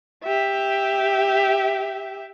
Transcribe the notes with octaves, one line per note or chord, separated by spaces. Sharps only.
G4 E5